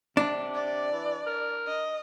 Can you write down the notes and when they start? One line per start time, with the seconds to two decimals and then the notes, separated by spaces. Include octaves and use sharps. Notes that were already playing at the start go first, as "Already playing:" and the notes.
0.17 C3 D4
0.55 D5
0.92 E3
1.26 A#4
1.67 D#5